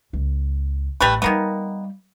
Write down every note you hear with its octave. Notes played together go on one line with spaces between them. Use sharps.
C#2
A1 G3 A3 B4
D#3 G3 A#3 B3 D#4